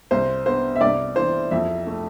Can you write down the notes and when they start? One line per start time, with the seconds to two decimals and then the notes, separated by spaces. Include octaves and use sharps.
0.11 C2 C5
0.46 B3 C5
0.76 E5
0.81 C2 D5
1.16 E3 C5
1.51 F2 E5
1.87 A3